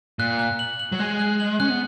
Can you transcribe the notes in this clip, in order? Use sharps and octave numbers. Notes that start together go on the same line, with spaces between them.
A#2 F#6
F#6
F#7
F#7
F#3
G#3 F#6
F#6
F#7
C#4 F#6
B3